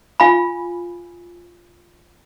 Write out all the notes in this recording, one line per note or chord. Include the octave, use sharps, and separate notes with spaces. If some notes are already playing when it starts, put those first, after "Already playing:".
F4 F5 G#5 B5